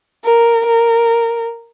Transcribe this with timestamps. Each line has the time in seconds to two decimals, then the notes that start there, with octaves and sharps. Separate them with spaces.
0.25 A#4
0.66 A#4